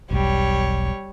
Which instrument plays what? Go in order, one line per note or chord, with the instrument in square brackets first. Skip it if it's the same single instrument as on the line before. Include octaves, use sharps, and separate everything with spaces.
[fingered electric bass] E1 B1 [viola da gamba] G3 C#5